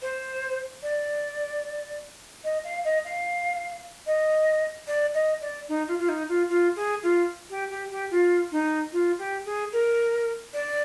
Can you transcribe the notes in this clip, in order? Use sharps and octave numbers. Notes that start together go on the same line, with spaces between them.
C5
D5
D#5
F5
D#5
F5
D#5
D5
D#5
D5
D#4
F4
F4
D#4
F4
F4
G#4
F4
G4
G4
G4
F4
D#4
F4
G4
G#4
A#4
D5